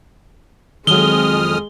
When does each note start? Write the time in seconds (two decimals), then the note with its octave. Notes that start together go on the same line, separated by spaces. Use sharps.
0.87 F2 D#3 F#3 G#3 D#6 F6 G7